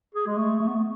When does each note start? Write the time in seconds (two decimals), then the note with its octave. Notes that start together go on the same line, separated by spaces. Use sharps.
0.15 G#4
0.27 G#3
0.37 A3
0.60 A3
0.68 B3
0.75 A3